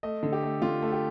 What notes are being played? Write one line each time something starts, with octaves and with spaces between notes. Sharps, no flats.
A3 D#5
D3
G4
A3
D3 F4
A3
G4